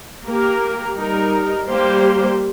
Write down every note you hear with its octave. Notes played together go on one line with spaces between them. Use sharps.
A#3 G4 A#4
G3 D#4 A#4
G3 A#3 G4 C5